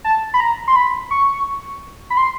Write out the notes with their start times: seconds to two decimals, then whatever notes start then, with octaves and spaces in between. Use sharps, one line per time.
0.04 A5
0.34 B5
0.40 A#5
0.68 C6
0.76 B5
1.11 C#6
2.10 B5
2.17 C6